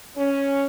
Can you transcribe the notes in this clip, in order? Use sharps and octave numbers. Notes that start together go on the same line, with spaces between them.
C#4